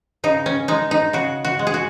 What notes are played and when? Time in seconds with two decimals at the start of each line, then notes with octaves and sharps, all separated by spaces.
0.24 C#3 D#4
0.46 C#4
0.68 G#3 D#4
0.91 D#4
1.13 C#3 F#4
1.45 F#4
1.59 G#3
1.67 G#4
1.74 F#4